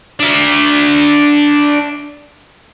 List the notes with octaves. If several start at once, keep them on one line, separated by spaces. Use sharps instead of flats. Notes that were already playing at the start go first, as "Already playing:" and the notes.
D4 E5